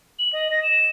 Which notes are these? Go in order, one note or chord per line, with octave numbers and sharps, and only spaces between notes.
F#7
D#5
A#6
E7